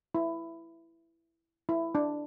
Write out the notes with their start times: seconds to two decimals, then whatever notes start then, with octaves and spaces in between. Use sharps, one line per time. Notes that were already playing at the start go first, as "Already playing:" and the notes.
0.15 E4
1.69 E4
1.95 D4